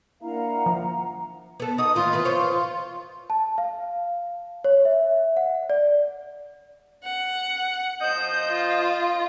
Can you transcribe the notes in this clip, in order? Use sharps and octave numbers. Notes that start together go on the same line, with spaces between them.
A#3 D4 E4 F5 F#5 A#5
F3
B3 A4
D#4 F#4 D#6
D#2 A2 E3 F4
E3 B4
C5 C#5
A5
F5
C#5
E5
F#5
D5
F#5
F3 C5 D#5 G6
F4